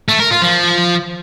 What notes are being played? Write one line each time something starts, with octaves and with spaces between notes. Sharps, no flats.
A3
A#4
F4
F3